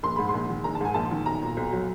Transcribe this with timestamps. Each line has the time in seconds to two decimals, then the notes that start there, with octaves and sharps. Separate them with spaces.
0.03 A#1 C6
0.16 G#2 B5
0.29 C6
0.34 A#1
0.49 D#3
0.64 A#1 A#5
0.75 A5
0.81 G#2 G#5
0.94 A#1 A5
1.11 D#3
1.26 B1 A#5
1.42 A#2
1.57 B1
1.72 F#3